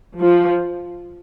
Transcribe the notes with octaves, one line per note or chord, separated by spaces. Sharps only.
F3